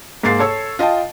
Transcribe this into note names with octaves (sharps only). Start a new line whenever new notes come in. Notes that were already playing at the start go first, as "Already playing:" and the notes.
G#2 A#3 A6 C7
A4 C#5 E6
F4 D#5 G5 A5